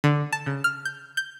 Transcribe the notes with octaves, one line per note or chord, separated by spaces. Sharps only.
D3
A5
C#3
F6
G6
G6